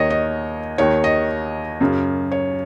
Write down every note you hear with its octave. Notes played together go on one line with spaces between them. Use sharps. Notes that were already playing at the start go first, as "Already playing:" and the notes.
Already playing: D#2 D#3 C#5 D#5
D#5
D#2 D#3 C#5
D#5
F#2 C#3
C#5